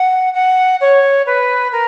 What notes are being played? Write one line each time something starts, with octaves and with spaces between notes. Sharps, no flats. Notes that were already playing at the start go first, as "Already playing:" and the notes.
Already playing: F#5
F#5
C#5
B4
A#4